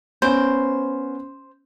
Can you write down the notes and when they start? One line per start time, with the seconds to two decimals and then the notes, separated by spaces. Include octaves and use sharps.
0.22 B3 C#4 C5